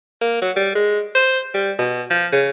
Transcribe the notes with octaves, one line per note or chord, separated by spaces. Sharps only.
A#3
F#3
G3
G#3
C5
G3
B2
F3
C#3